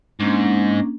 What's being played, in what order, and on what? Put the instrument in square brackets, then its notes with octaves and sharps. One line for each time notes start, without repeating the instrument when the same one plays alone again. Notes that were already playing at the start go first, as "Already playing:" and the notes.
[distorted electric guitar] G#2 [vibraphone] A#3 C#4 D4